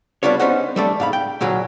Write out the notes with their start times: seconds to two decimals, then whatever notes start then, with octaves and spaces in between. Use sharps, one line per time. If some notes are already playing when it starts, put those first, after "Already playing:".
0.23 G3 B3 D4 F4 C#5
0.40 B3 C#4 D#4 C5 D#5 F#5
0.76 G3 A3 D4
1.00 G#2 F5 B5
1.13 G5
1.41 D2 A#2 D3 F#3